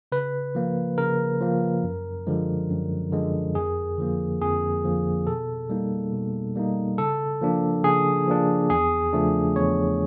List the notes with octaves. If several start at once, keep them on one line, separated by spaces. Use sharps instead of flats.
C#3 B4
F3 A#3
C#3 A#4
F3 A#3
F#2
D3 F3 G#3
F#2
D3 F3 G#3
F2 G#4
D3 F3 A#3
F2 G#4
D3 F3 A#3
B2 A4
G3 A#3 D#4
B2
G3 A#3 D#4
C#3 A4
F3 A#3 D4
C#3 G#4
F3 A#3 D4
E2 G#4
C#3 F3 A3 D4
E2 C#5